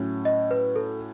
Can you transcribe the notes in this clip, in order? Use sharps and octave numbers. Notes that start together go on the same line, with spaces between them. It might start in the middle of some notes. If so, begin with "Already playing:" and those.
Already playing: A2 F#3 C#4
D#5
B4
A4